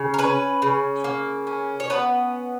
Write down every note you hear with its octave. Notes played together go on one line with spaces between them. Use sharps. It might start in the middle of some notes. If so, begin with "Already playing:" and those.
Already playing: C#3
A#4
C#4 B4
C#3
A#3
C#4
C#5
B3 B4